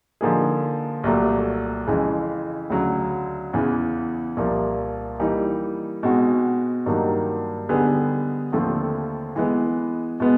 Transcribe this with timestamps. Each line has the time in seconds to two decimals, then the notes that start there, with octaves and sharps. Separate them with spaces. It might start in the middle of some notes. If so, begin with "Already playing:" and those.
0.21 D3 F3 A#3 D#4 G#4
1.04 C2 A#2 F#3 A3
1.87 F2 C#3 E3 G#3
2.70 D2 C#3 F#3
3.53 E2 C#3 E3
4.37 C2 A#2 F3 A#3
5.19 E3 G3 A#3 D#4
6.03 B2 G#3 C4 D#4 F#4
6.86 G2 D#3 F#3 A#3 D#4
7.69 D3 G3 B3 D#4 G#4
8.52 D#2 D3 F3 A3 C4
9.36 E3 G#3 B3
10.20 B2 G#3 B3